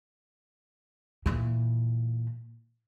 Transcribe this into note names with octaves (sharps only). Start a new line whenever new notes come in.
A#2 E3